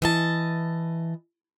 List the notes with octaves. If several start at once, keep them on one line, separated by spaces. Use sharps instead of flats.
E3 D#5 A5